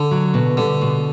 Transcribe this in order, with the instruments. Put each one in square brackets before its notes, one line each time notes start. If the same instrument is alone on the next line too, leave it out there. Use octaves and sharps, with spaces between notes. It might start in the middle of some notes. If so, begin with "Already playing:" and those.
Already playing: [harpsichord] D3
[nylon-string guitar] F#3
B2
[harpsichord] D3 [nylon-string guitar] G3
[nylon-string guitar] B2